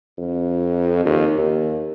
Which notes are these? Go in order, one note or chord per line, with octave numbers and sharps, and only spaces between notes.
F2
D#2
D#2